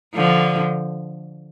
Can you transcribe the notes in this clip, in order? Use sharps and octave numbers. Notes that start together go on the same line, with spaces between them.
D3 F3